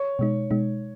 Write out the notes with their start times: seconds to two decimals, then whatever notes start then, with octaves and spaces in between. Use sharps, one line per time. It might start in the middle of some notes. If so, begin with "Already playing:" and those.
Already playing: C#5
0.19 B2 G#3 D#4
0.51 B2 G#3 D#4